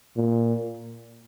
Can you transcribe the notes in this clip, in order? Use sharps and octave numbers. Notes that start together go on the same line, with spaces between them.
A#2